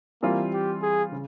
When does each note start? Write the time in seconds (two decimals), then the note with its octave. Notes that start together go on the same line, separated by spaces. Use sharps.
0.22 E3 G3 A#3 C4 F4
0.53 G4
0.82 G#4
1.12 C#3